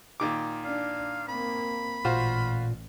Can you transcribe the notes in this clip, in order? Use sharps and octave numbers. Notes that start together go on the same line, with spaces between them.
A#2 D#3 D6
D4 F5
A#3 C4 B5
A1 A#2 F4 F#4 C5